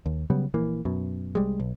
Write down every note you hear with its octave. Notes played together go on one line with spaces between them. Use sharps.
D#2
C#3 F#3 G3 B3
A#1 E3 A#3
F#2 B2
C2 G3 G#3
B1